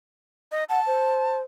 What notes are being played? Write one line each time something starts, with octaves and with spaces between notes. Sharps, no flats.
D#5
F#5 A5
C5